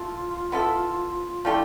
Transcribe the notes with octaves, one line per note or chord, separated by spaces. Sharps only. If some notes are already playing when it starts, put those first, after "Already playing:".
Already playing: E4 F4 A4
B3 E4 A4
F3 A3 D4 E4 G4